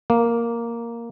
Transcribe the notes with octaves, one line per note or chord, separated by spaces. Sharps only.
A#3